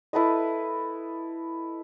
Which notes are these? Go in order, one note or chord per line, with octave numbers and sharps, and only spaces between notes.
E4 A4 B4 D#5